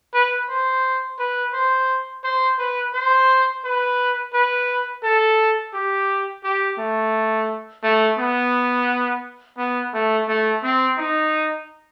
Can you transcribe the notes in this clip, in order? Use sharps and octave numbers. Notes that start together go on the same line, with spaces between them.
B4
C5
B4
C5
C5
B4
C5
B4
B4
A4
G4
G4
A3
A3
B3
B3
A3
A3
C4
D#4